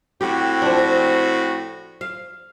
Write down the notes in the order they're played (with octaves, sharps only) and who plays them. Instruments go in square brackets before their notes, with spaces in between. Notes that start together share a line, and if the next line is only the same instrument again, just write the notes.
[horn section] A2 C4 F#4 [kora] G4
[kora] F3 D4
F5